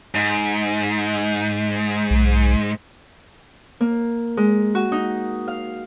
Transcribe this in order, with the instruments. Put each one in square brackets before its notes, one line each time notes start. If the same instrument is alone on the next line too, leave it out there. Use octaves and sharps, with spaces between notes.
[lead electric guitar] G#2
[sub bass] B1
[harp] A#3
G#3
F#4
D#4
F5